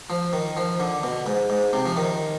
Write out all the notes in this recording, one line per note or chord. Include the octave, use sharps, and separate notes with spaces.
F3
D#3
F3
D3
B2
G#2
G#2
C3
F3
D#3